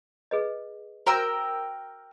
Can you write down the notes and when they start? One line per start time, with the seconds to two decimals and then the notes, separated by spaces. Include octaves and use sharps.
0.31 G#4 B4 D#5
1.06 F#4 A#4 C5 G5 A#5 E6